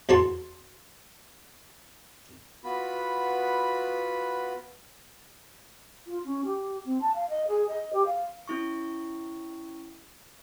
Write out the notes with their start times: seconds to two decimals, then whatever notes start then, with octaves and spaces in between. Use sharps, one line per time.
0.09 E2 F#4 A5 C6
2.64 B3 F4 F#4 B4 B5
6.07 F4
6.24 C#4
6.45 G4
6.85 C4
7.01 A5
7.14 F5
7.30 D#5
7.48 G#4
7.68 D#5
7.93 G4
8.05 F5
8.48 C#4 E4 C#6